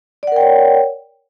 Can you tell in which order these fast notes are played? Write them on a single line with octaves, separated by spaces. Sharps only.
D5 F#5 A#4 G5 C#5